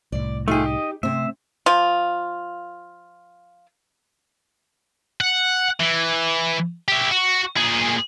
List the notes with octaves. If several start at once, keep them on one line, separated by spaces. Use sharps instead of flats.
C2 A2 D5
A3 D#4 F4 G4 G#4
D#5
C3 A3 C4 C5 E5
F3 F4
F#5
E3
E4 G4
F#4
A#2 G#4